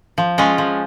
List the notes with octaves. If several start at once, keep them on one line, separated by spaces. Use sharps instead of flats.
F3
G#3 C#4 F4
F3